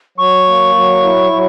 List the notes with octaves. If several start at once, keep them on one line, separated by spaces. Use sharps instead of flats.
F#3 C#6
A#3
F#3
E4
F#3